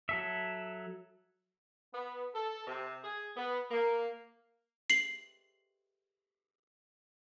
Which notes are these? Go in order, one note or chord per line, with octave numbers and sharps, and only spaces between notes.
F#3 A4 E5
B3
A4
C3
G#4
B3
A#3
C7 F#7